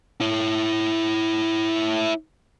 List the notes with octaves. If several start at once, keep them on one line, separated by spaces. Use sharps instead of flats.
E4 C#5